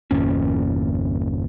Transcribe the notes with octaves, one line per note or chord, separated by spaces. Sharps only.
G1 E2 A#2 C#4